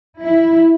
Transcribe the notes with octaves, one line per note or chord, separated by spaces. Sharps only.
E4